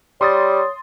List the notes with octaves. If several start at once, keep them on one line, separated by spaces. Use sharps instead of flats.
G3 C#5 C6 D#6 A6